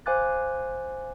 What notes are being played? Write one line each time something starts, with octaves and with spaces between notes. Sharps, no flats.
C5 F5 G#5 D6 F#6 A6